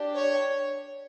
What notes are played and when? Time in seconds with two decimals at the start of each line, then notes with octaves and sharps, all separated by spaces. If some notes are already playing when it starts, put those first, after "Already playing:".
Already playing: D4 G4
0.15 C#5